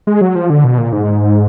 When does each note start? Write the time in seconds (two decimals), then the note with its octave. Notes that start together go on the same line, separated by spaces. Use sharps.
0.07 G#3
0.21 F#3
0.35 F3
0.50 D3
0.64 B2
0.78 A#2
0.93 G#2